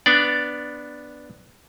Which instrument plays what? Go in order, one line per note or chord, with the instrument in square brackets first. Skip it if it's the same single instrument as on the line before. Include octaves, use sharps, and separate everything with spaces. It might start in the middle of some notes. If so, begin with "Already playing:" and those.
[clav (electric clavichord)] B3 D4 D5